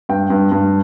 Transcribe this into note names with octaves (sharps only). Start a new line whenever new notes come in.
G2 G5
G2
G2